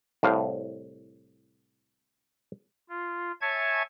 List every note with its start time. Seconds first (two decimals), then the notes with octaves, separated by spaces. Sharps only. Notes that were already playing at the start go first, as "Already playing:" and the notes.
0.23 C2 A2 F5
2.89 F4
3.41 C#5 E5 G#5 A5 C#6 G#6